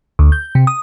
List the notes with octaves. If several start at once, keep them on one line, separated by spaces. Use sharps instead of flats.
D2
G6
C3
D#6